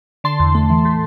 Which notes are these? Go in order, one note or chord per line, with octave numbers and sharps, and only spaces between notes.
D3 A5 C6
E2
A3
E3
A2